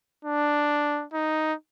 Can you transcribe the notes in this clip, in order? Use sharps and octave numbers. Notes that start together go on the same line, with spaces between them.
D4
D#4